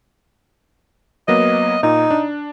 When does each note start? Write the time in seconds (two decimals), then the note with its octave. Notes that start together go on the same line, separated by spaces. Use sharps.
1.28 F#3 A#3 B3 D#5
1.83 A#2 D#4
2.11 D4